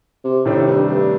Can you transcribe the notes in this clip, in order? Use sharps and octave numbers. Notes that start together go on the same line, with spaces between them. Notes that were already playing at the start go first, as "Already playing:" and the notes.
C3
A2 C3 D#3 A3 D4
G2
G2